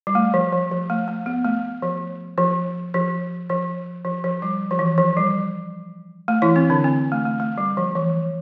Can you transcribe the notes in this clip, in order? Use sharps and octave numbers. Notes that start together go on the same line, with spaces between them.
G3
A3
F3
F3
F3
A3
A3
B3
A3
F3
F3
F3
F3
F3
F3
G3
F3
E3
F3
G3
A3
E3 E4
C4
D3 D4
C4
A3
A3
A3
G3
F3
E3